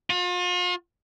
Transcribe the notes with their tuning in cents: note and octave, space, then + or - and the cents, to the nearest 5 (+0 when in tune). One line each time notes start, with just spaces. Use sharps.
F4 +40